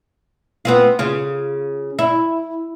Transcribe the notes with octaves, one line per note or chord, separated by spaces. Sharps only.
B3 C4 F4
C#3 F4
E4